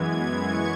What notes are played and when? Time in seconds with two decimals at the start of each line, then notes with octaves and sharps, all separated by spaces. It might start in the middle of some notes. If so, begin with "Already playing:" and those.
Already playing: F#2 E3 G#3 B3 G#6
0.15 G#6
0.44 C#6